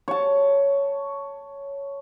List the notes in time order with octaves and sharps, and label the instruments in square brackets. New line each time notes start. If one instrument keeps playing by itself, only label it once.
[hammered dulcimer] C#5 A5